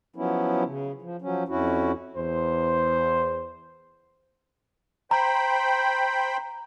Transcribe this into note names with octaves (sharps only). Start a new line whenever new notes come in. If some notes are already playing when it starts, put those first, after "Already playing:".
F3 F#3 B3 C#4 E4
C#3
F3
F3 F#3 C#4
F2 C#4 E4 F#4
E2 C5
C5 G5 A#5 B5